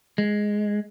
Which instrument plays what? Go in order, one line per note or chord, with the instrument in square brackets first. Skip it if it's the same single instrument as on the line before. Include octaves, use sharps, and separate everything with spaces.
[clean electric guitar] G#3